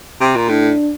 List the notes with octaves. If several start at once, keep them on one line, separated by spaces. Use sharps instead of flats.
C3
A#2
A2 D4